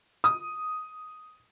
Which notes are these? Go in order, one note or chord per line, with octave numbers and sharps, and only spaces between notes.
D#6